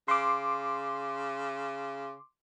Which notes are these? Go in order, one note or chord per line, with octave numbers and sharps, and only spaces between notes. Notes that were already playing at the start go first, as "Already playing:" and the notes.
C#3 C6 D6